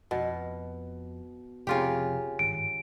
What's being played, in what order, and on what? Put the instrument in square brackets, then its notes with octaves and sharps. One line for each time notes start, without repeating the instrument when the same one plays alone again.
[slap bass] F2 [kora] B2
[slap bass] F1 C4 [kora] C#3 F4 G4
[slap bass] G#1 G2 [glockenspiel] D7